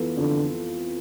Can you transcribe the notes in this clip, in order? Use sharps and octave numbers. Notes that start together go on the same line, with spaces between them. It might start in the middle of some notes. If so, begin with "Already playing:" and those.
Already playing: F2 E3 B3 F4 A4
F2 D3